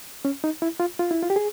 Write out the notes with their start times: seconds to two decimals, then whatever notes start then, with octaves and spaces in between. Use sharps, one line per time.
0.25 C#4
0.44 D#4
0.62 E4
0.80 F4
0.99 F4
1.11 E4
1.22 F4
1.30 G4
1.36 G#4